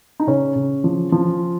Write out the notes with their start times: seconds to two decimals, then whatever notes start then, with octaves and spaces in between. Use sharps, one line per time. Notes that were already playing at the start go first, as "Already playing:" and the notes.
0.20 D#4
0.27 C#3 C#4
0.56 C#3
0.84 F3
1.12 F3